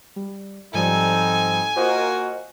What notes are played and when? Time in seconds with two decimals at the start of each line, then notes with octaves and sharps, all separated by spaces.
0.16 G3
0.74 G#2 F3 G3 C4 D#4 A4 G#5
1.76 A#3 F4 F#4 A#4 C5 D#5